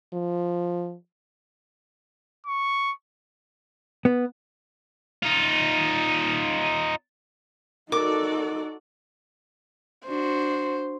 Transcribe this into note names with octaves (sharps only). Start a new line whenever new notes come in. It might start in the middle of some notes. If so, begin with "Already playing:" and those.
F3
C#6
B3
D#4 F4
D#4 F#4 A4 A#4 D5 D6
D4 F#4 C5